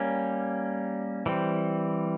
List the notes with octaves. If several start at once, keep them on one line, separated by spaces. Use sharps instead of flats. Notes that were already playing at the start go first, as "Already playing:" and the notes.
Already playing: G3 A#3 C#4
E3 G3 C4